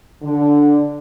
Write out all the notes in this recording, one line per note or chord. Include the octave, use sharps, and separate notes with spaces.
D3